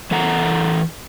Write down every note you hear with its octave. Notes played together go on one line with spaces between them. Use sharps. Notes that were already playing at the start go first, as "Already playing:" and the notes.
E3 A4 F#5 A#5